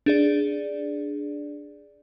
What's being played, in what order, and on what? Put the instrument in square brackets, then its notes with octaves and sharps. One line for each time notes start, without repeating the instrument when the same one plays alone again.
[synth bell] D4 G#4 D5